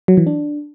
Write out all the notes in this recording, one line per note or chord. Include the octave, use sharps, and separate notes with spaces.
F#3
E3
D4